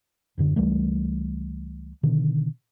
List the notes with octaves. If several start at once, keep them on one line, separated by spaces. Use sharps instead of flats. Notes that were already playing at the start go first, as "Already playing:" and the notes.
D#1 F#2 D3
C#2 E3 G3 A3
B2 D3 D#3